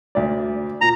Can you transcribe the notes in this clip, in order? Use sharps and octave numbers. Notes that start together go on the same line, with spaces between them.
D2 D5
A#2 A#5